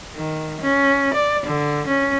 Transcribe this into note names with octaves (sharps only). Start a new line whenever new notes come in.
D#3
C#4
D5
D3
C#4